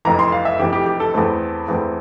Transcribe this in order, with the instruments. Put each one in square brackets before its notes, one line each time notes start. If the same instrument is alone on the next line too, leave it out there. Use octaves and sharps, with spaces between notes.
[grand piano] F1 F2 E3 A#5
C6
F5
E5
F1 F2 E3 G4
G4
G4
A4
E2 E3 A3 C4 A4
E2 E3 A3 C4